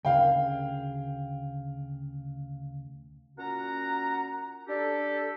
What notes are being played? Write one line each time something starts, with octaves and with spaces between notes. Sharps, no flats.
D2 C#3 G#4 F5 G5
A#2 C#4 F#4 F#5 A#5
D4 G4 A4